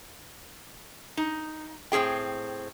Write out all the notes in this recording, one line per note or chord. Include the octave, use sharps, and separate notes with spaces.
D#4
A2 C4 C#4 G#4 G5